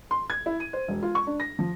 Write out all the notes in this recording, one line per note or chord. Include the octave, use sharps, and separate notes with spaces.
C6
G#6
E4
D#7
C5
E1
F4
C#6
D4
A#6
F3